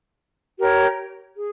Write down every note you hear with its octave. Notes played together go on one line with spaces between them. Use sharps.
G4 A#4 C#5
G#4